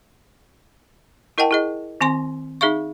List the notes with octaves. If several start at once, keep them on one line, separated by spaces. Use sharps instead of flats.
E4 A#4 D#5 F#5 G5 A5
E4 G#4 D#5
D#3 C4 G#5 C6
D#4 G#4 E5 F5 C#6